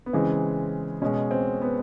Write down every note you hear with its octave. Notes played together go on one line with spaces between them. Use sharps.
B3
C#3 E3 G#3 C4
B2 G#3 C#4
C4
B3